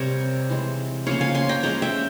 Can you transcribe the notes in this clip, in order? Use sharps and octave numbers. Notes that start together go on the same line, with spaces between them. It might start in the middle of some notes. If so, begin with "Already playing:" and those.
Already playing: C3 G3 C4 A#4 C#5
E3 G#3 C4
C#3 F3 A#3 C#4 C#5 F5
F5 G#5
G#5 C6
G5 A#5
F3 G#3 C#4 G5 A#5
E5 G5